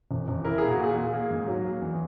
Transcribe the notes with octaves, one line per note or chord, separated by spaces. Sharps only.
E1
E1
E4 A#4
A#2 G#4
F#4
A#2 G#4
A#2
A#3 G#4
G#2
F#3
A#3
E2